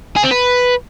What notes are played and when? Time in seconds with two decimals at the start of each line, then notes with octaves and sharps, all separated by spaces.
0.16 G#4
0.23 C4
0.31 B4